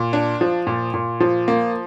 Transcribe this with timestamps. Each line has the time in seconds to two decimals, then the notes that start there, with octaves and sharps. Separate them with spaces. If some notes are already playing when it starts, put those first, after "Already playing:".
Already playing: A#2
0.13 D4
0.41 F3
0.67 A#2
0.94 A#2
1.20 F3
1.48 A#3